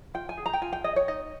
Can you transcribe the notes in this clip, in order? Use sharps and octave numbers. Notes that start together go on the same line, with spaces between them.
F4 G5
G#5
G#4
A#5
G5
F4 G#5
G5
G#4 D#5
C#5
D#4 D#5